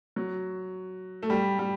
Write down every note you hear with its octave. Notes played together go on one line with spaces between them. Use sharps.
F#3
A3
G3
G3